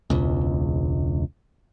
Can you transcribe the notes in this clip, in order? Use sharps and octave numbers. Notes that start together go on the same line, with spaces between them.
E1 C#2